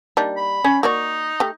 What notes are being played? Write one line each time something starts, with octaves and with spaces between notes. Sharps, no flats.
G3 A#3 D4 D#4
B5
C#4
A#3 D#4 F#4 D5 C#6
A3 G4